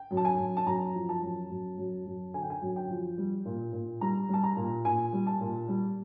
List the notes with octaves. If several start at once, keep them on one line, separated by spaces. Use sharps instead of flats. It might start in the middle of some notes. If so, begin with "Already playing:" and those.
Already playing: G5
F#2
A5
G#5
F#2
A5
F#2 A#5
F3
A5
F#2
F#2
F#2
F#2
D3 G#5
G5
G#5
F#2
G5
F3
G3
A#2
A#2
G3 A#5
G3 A5
A#5
A#2
A#2 G#5
G3
A5
A#2
G3